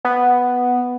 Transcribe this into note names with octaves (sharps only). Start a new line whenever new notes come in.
B3